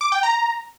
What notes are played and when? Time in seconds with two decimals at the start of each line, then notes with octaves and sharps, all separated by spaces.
0.01 D6
0.12 G5
0.23 A#5